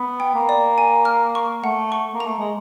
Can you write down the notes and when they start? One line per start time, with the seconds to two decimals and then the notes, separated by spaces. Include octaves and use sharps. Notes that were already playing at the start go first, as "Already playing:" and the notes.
Already playing: B3
0.20 G5
0.35 A#3
0.49 D5
0.78 G#5
1.05 F6
1.35 C#6
1.64 A3 F#5
1.92 C#6
2.14 A#3
2.20 A#5
2.27 A3
2.38 G#3